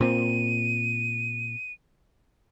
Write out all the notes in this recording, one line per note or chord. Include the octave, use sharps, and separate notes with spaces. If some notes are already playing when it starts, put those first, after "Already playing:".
A#2 C4 D#7